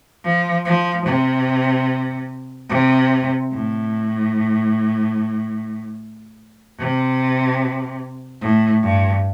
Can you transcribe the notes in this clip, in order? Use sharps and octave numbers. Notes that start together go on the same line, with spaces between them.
F3
F3
C3
C3
A2
C3
A2
G2